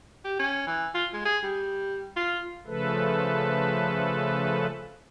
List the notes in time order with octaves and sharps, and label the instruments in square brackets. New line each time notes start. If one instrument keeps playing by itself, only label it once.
[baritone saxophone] G4
C#4
E3
F4
G#3
G#4
G3
F4
[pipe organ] C#3 F3 A3 A4 B4